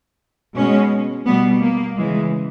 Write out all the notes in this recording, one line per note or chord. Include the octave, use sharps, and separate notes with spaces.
B2 G#3 C#4
B2 G3 B3
A#3
C#3 E3 G#3